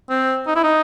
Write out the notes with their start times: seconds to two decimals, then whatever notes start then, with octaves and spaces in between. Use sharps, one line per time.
0.10 C4
0.47 D#4
0.56 E4
0.63 D#4